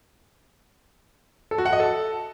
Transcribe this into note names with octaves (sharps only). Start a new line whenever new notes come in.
A4
F#4
F#5
D#5
A4